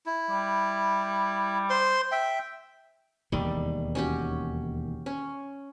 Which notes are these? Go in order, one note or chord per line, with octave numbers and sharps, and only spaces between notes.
E4
G3
C5 C6
E5 G5
E1 D#2 D#3 G3
C#4 F#4 G4
C#4